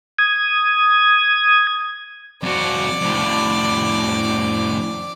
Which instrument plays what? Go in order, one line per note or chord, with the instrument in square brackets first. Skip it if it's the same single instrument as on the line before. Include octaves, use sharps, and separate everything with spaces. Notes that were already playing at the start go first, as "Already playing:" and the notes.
[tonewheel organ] D#6 G#6
[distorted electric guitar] F2 F#4 [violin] D5
[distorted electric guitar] F2 A2